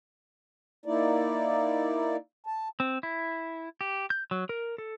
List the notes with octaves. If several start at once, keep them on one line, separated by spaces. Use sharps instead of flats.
A#3 D#4 E4 D5
A5
C4
E4
G4
G6
F#3
A#4
A4